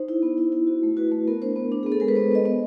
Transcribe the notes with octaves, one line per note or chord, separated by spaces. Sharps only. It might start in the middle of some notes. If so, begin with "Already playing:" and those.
Already playing: D#4 C5
E4
B3
E4
E4
F#4
A3
F#4 B4
A3
B3 A#4
D4 C5
B3
D4
B3 G#4
A4
G#3 A#4
B4
B3 C5
B3 D#5
B3